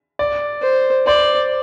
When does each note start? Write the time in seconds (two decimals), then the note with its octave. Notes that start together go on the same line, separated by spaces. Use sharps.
0.19 D5
0.62 C5
1.07 C5 D5